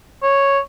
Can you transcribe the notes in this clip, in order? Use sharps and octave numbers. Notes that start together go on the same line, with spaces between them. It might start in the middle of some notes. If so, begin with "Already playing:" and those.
C#5